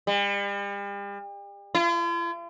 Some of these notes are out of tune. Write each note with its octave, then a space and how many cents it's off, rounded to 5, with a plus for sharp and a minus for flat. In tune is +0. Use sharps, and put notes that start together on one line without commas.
G3 +40
F4 -45